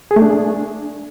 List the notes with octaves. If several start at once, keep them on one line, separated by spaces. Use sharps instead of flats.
G#4
A3
D4